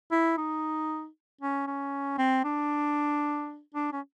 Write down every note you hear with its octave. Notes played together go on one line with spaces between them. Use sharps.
E4
D#4
C#4
C#4
C4
D4
D4
C#4